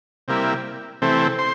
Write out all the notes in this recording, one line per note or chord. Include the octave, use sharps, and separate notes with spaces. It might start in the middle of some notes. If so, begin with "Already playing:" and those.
C3 G3 A#3 E4
C3 E3 A3 C4
C5